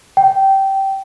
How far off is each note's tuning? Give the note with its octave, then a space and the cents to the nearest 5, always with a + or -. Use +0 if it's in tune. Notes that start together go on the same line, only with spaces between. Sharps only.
G5 -15